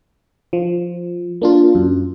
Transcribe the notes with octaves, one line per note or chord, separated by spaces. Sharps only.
F3
A#3 D4 F4
F#2